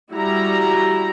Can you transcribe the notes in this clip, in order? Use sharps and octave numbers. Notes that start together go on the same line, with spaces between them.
G3 E4 F#4 A#5